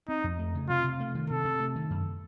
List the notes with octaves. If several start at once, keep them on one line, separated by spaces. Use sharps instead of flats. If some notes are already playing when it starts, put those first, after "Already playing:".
C4 D#4
F2
A3
C#3
C3 F4
C3
A3
D#3
C3 A4
C3
A3
D#3
F#2